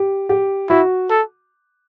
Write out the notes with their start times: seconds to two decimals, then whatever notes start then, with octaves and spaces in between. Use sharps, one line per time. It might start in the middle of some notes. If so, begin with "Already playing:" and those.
Already playing: G4
0.29 G4
0.69 E4 F#4
1.10 A4